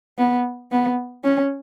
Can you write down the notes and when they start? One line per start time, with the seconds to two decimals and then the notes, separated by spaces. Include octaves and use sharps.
0.18 B3
0.72 B3
1.24 C#4